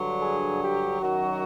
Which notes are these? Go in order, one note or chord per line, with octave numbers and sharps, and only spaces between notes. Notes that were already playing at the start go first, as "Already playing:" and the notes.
Already playing: G2 D3 F#3
G#4
G4
F#2 D#3 F#3 F#4